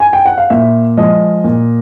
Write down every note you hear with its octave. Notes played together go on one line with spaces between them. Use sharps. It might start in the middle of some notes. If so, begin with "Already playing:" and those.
G#5
G5
F#5
F5
A#2 E5
F3 G#3 D#5
A#2